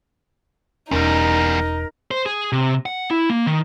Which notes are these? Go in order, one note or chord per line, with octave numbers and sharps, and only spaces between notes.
E1 E2 G3 C#4 D#4 A#4
C5
G#4
C3
F#5
E4
A#3
D#3